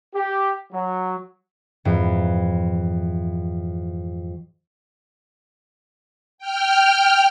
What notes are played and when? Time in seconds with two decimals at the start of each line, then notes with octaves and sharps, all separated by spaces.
0.15 G4
0.72 F#3
1.85 F2 G#2 E3
6.38 G5 F6